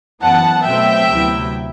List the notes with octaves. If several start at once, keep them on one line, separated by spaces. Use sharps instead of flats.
F#2 E3 B3 F#5 A5
B2 F#3 A3 C4 E5 G5
D2 C3 F#3 B3 E4